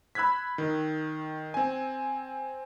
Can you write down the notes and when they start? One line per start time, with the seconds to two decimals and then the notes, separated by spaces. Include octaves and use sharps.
0.15 B5 E6 F#6 G#6 B6
0.58 D#3
1.54 C4 G#5